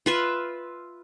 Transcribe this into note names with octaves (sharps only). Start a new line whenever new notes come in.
F4 B4 E5